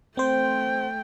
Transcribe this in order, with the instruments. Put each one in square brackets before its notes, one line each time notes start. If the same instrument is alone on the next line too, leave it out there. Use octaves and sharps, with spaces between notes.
[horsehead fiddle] A3 G5 [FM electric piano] C4 C5